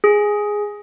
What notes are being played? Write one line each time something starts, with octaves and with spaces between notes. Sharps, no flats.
G#4